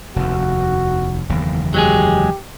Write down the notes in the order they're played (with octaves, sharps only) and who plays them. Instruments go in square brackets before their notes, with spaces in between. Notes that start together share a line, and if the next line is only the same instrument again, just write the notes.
[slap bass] F1 D#2 [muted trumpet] F#4
[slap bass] F#1 E2 D#3
[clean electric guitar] F#3 G#3 G#4 [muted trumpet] G4